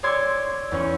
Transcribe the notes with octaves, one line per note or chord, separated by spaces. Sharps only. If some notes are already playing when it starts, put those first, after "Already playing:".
C#5 D5 C6 E6 G#6
E2 C#4 C#6